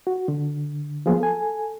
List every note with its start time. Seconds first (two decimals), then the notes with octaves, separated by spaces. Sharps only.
0.07 F#4
0.28 D3
1.06 F3 F#3 A#3 B3 F4 G#4
1.20 A4 G#5